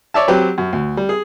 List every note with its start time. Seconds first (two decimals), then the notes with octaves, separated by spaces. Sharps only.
0.14 C#5 D5 E5 A5
0.28 F#3 C4 G4 B4
0.58 F#2
0.73 D2
0.97 G3
1.09 G#4